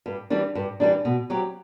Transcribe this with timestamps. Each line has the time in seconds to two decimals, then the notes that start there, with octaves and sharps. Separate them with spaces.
0.06 G2
0.30 E3 G3 D4
0.55 G2
0.80 E3 G3 D4
1.05 B2
1.30 F#3 C4 G4